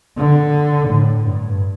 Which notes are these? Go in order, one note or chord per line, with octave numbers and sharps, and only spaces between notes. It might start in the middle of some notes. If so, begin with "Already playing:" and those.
D3
A2
G2